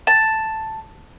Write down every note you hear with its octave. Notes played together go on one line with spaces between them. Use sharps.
A5